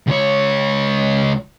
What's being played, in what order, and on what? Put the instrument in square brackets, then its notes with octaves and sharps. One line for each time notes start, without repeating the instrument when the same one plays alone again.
[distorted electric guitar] C#2 C#5